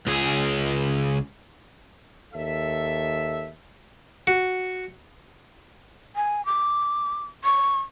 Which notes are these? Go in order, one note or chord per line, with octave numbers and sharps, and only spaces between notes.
C#2 G#4
D#2 A4 E5
F#4
G#5
D6
C#6